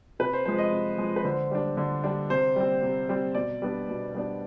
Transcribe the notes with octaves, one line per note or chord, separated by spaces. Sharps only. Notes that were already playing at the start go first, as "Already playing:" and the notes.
C3 B4
C5
F3 G#3 C5
D#5
C3
F3 G#3
B4
D3 C5
G3 D4
D3
G3 D4
C3 C5
G3 C4
C3
G3 C4
B2 D5
G3 B3 D4
B2
G3 B3 D4